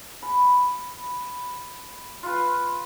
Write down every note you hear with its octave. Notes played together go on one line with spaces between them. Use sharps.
B5
F4 B4